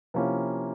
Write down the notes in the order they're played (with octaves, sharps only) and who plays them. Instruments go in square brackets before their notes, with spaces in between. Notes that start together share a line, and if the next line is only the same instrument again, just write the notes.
[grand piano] C3 F3 A#3 C#4 E4